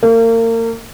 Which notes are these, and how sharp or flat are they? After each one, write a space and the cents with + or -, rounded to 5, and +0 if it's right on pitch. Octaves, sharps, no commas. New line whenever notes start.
A#3 -35